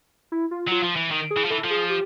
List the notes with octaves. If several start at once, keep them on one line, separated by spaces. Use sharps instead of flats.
E4
F4
F#3 F4
F3
E3
D#3
G#4
E3
F3
E3 A4
F3
G#4
G4